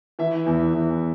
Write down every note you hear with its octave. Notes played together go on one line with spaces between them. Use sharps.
E3 E5
E2
E2